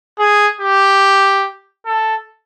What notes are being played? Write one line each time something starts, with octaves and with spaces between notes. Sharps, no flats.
G#4
G4
A4